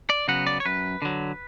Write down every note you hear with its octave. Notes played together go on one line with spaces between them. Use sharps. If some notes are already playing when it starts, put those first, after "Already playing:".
D5
C#3 F#3 B3 F#5
D5
C#5
F#2 B4
D3 F#3